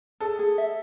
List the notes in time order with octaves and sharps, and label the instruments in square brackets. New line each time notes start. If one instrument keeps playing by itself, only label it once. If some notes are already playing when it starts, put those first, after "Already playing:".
[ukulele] G#4 [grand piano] A4
[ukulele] G#4
E5